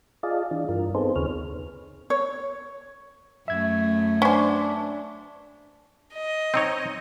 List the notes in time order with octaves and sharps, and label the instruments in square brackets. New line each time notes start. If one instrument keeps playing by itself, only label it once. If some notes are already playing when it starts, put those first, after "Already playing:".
[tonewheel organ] F4 G#4 D5 D#5 F5 A5
E3 D4
G2 F4 A#4
B3 C4 D#4 G#4 A4 C5
D#2 C#3 G#4 B4 C#5 F6
[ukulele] C#5
[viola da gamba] F#2 A3 [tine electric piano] E5 G#6
[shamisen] C#4 C5 [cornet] D4
[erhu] D#5
[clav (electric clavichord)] C4 D#4 C#5